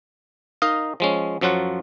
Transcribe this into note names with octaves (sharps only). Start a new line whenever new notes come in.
D#4 A#4 D#5 F5
F3 G#3 C#4
F#2 F3 F#3 F4 F#5